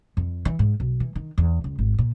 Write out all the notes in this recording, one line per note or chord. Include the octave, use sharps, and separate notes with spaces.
F2
E3
G#2
B1
E3
D#3
E2
C#2
G#1
A#2